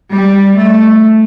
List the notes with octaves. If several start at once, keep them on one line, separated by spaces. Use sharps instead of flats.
G3
A3